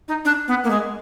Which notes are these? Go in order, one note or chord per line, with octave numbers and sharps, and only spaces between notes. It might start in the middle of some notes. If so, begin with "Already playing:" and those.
D#4
D4
B3
A#3
G#3